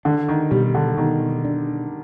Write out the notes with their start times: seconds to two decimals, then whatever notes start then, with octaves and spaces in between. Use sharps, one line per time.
0.05 D3 D4
0.28 D#3
0.51 B2 G3
0.75 D3
0.97 B2 D#3
1.45 D4